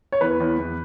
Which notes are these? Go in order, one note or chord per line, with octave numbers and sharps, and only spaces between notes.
C#5
E2 B4
E2
E2